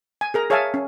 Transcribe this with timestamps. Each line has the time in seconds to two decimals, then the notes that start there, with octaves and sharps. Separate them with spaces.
0.21 G#5
0.34 G#4 A#4 A#5
0.50 G#4 C#5 E5 F5 G#5 A5
0.74 C#4